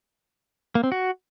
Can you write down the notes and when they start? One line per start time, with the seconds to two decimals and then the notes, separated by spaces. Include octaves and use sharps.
0.75 A#3
0.84 C4
0.92 F#4